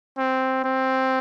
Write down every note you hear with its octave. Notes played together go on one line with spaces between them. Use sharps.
C4
C4